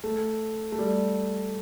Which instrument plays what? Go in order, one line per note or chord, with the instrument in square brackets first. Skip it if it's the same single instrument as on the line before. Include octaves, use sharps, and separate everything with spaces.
[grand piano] A3
A3
G3